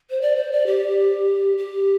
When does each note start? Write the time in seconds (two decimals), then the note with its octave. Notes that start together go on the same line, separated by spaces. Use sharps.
0.10 C5
0.21 D5
0.36 C5
0.52 D5
0.66 G4
1.58 G4